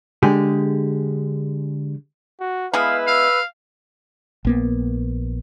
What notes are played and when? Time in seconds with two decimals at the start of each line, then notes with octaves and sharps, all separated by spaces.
0.23 D3 G#3 G4 G#4
2.40 F#4
2.73 G#3 B3 E4 B4 F5
3.07 F5 E6
4.45 A#1 A#3 B3